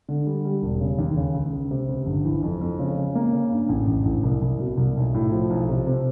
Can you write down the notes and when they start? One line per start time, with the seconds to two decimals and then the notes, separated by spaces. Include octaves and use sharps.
0.09 D3
0.26 G3
0.44 G3
0.63 E1
0.80 C#3
0.99 D#2
1.17 C#3
1.34 C#2
1.53 C#2
1.71 C3
1.89 C#2
2.06 G1
2.25 E3
2.43 F2
2.61 F2
2.79 C#3
2.97 C#3
3.15 A#3
3.33 C#3
3.51 G2
3.69 A1
3.88 A1
4.05 A1
4.23 C2
4.42 C2
4.60 B2
4.78 C2
4.97 B1
5.14 A2
5.32 F3
5.50 B1
5.69 C3
5.87 C3